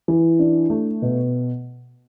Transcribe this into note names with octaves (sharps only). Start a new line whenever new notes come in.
E3
D4
A3
B2